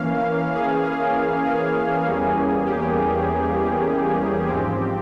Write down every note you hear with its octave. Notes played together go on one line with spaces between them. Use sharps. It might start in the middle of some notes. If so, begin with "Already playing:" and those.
Already playing: E3 A#3 C#4 F5
G#4
G#4
G#4
E2 E3 G3 A#3 C#4
G4
G#2 F3 C4 G4